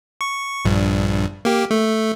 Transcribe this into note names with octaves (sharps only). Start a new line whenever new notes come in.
C#6
A#1 G2
A#3 G4
A3